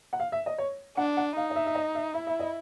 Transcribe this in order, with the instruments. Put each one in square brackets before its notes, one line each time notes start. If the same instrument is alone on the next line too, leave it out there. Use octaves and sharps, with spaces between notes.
[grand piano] F#5
F5
E5
D#5
C#5
[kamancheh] D4 [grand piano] F#5
[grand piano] F#5
[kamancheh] D#4 [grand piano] F5
[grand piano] D#5
E5
E5
D#5
E5
[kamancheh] E4 [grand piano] E5
[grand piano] E5
D#5